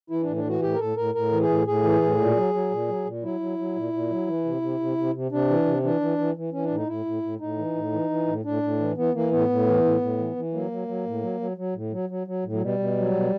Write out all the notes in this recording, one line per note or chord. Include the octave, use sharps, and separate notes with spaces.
E3 E4
A2 D4
D4
E3 F#4
A2 G4
A#4
A2 A4
A2 A#4
A2 A#4
E3
G#4
A2
A2 G#4
E3
A2
A#2
F#3
F#3
A#2
F#3
A#2
F#3 E4
F#3
F#3
A#2
A#2
F#3
E3
C3
C3
C3
C3
C3
C3 D4
E3
C3
E3 D4
E3
E3
E3
E3 C#4
D4
A2
D#4
A2 E4
A2
A2
A2 D#4
E3
A2
E3
E3
A2
A2 D4
A2
E3
E3 B3
E3 A#3
A2 B3
A2
E3
A2
A2
E3
E3
F#3 A#3
F#3
F#3
A2
F#3
F#3
F#3
A2
F#3
F#3
F#3
A2
F#3
B2 G3
B2
F#3
B2